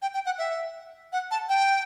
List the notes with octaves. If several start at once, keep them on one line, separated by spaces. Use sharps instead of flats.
G5
G5
F#5
E5
F#5
A5
G5